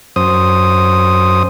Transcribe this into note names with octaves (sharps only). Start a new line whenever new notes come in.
F#2 C5 D#6